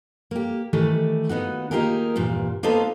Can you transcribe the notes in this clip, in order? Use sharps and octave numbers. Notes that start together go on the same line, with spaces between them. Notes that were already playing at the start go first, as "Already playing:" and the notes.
A#3 G4
D#3 E3 G3 A3 D5
D#2 B3 D#4 F#4
A#3 D#4 F4 G4 G#4 A#4
E2 G2 A#2 G3
A#3 B3 D#4 F4 A4 C5